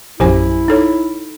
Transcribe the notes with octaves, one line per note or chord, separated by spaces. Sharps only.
A#1 F#2 E4 G4 C5 G#5
D#4 A4 C#5